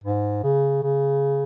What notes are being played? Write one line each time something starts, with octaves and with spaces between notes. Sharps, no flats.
G#2
C#3
C#3